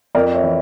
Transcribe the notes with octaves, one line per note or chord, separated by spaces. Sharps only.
F2 A#4 D5
C#5 E5
E3